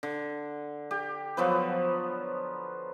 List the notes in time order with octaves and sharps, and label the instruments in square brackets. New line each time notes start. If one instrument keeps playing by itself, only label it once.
[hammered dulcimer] D3
G4
F3 F#3 B3 B4